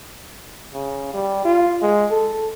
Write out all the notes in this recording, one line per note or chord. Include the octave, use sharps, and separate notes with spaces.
C#3
G3
F4
G#3
A4